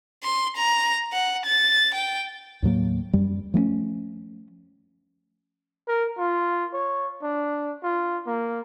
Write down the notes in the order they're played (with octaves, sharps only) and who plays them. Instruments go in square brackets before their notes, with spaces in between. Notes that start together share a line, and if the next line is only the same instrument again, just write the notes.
[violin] C6
A#5
F#5
A6
G5
[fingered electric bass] D#2 A2 F#3 A#3
F#2 G3
F3 A3 B3 C#4
[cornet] A#4
F4
C#5
D4
F4
A#3